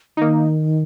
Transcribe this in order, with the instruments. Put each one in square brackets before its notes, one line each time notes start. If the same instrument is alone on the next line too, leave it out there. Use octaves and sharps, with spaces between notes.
[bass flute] D#3 [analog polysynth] A#3 D#4